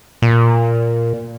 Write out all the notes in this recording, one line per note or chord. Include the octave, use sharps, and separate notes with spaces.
A#2